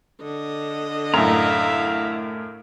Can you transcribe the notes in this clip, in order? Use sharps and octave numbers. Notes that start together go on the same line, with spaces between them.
D3 D#5
F#2 A2 E5 F5 A#5